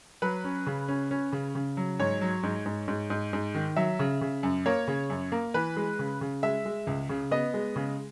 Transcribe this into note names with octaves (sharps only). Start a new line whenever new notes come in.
F#3 B4
C#4
C#3
C#4
C#4
C#3
C#3
F#3
G#2 C#5
F#3
G#2
G#2
G#2
G#2
G#2
D#3
F#3 E5
C#3
C#3
F#2
A#3 C#5
C#3
F#2
A#3
E3 B4
G#3
C#3
C#3
G#3 E5
G#3
C#2
C#3
B3 D#5
G#3
C#3